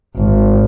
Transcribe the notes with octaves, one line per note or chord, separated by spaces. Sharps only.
G#1